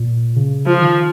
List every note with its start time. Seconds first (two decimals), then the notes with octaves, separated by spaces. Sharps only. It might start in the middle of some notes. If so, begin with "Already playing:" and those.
Already playing: A#2
0.36 C#3
0.66 F3
0.81 D#3